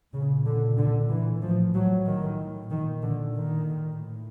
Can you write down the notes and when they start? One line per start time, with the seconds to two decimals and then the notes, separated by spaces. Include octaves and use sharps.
0.13 A#2 C#3
0.46 D3
0.78 D3
1.10 E3
1.42 A2 F3
1.74 F#3
2.06 D#3
2.71 A#2 D#3
3.02 D3
3.35 D#3
3.99 A2